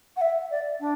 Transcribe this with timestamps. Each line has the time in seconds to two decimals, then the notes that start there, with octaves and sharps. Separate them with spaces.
0.16 F#5
0.21 E5
0.50 D5
0.80 D4